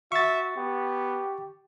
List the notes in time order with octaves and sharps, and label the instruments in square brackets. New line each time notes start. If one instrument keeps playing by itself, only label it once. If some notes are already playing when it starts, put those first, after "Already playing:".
[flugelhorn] F#4 [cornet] E5 [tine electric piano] C#6 A6
[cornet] B3 [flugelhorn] G4